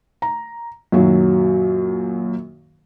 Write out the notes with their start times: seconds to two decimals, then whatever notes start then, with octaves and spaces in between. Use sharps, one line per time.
0.22 A#5
0.92 F#2 A#2 D#3 F#3